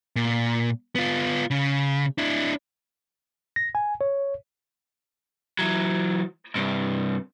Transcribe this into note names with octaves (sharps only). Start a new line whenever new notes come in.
A#2
B3 F4
C#3
D4 E4
A#6
G#5
C#5
E3 F#3
G2 C3